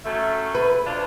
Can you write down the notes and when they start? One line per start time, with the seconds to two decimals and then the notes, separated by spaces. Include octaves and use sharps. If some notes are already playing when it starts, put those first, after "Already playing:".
0.05 F#2 A3
0.55 B4
0.86 D2 D4 F4